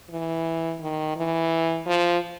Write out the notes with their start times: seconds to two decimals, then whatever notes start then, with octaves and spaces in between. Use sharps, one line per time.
0.10 E3
0.81 D#3
1.16 E3
1.87 F3